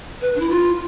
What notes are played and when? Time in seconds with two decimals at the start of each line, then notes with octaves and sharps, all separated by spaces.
0.21 B4
0.35 D4
0.40 E4
0.50 F4